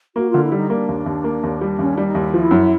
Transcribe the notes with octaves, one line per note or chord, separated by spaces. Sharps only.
A#3 F#4
D3 F4
E4
G3 D#4
A#3 D4
D#2
D#2
A#3
D#2
G3
D#2 C#4
D4
G3
D#4
D#2 E4
F3 E4
F#2